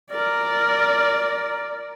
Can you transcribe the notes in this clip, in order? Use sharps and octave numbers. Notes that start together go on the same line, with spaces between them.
A#4 D5